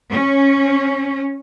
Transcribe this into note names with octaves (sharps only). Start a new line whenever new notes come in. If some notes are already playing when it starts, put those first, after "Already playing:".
C#4